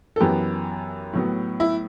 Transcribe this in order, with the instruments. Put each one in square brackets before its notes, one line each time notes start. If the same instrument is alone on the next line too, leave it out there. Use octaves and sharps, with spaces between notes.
[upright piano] A4
F#2 E3 B3 G4
A2 F#3 B3
E4